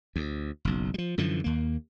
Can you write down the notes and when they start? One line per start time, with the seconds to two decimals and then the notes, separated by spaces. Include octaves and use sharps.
0.16 D2
0.65 F#1 B1
0.94 F3 G3
1.18 F#2 D3 E3 F3
1.44 D#2 A#3